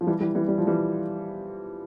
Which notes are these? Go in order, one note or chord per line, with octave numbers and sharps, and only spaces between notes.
F3
E3 G3
E3 G3
E3 G3
G3
F3
E3 G3